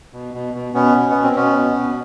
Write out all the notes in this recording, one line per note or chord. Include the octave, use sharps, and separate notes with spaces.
B2
B2
B2
B2 B3 C#4
B2
B2 B3
C4
B2 B3 C#4
B2
B2